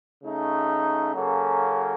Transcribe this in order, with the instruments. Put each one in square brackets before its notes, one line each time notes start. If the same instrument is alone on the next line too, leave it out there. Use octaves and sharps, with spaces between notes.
[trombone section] C#3 A3 D#4
C#3 F#3 A#3 C#4 A4